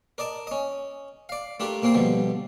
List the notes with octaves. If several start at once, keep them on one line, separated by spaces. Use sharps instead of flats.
A#4 D5 D#5 A5
C#4 D#5
D5 F5
A3 D4 F4 G4 A#4
A#2 A#3 C4 F4 C6
B2 D3 F3 G3